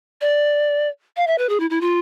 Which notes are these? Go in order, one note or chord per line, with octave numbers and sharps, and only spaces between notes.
D5
F5
E5
B4
G#4
E4
E4
F4